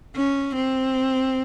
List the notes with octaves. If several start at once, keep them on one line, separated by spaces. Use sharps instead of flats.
C#4
C4